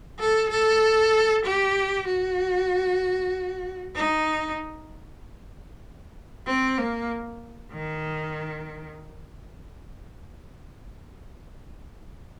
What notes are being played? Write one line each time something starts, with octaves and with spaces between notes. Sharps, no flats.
A4
A4
G4
F#4
D#4
C4
A#3
D#3